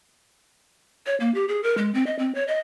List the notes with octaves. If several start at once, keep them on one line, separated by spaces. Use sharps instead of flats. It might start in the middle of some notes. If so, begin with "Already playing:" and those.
C#5
A#3
G4
G#4
A#4
G#3
C4
D#5
C4
C#5
D#5